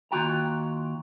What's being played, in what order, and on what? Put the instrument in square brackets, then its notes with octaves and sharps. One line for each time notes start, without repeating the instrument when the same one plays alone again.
[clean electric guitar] D#2 F4 F#4 G5 A#5